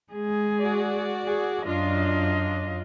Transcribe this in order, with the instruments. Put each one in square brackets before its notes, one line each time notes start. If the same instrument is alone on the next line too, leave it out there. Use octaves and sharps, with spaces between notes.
[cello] G#3 G#4
[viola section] F#4 D5
[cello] G#4
[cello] F#2 D#5 [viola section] D4 F4